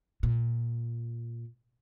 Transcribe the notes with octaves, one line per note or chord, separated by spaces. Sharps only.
A#2